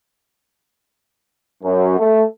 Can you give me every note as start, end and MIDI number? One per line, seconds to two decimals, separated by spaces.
1.63 1.97 42
1.98 2.22 57